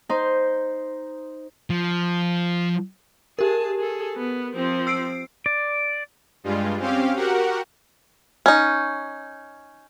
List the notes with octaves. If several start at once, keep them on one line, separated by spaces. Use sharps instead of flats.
D#4 C5
F3
G4 G#4 A#4 A5
G#4 A4
B3
F3 C4
E6 C7 D7
D5
G2 G3 G#3 F4
C4 C#4 G4 F5
F#4 G4 A#4 F#5
C#4 D#4